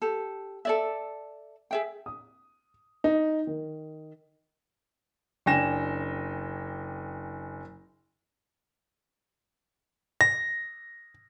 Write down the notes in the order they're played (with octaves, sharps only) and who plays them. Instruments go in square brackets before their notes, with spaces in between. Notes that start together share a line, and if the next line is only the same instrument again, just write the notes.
[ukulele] G4 A4
A4 D5 E5
G#4 E5 G5
[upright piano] D#6
D#4
D#3
F#1 D4 G5 G#5 A#6 E7
[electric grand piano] A#6